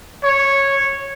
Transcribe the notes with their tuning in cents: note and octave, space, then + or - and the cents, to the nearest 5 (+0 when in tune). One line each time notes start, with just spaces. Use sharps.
C#5 -10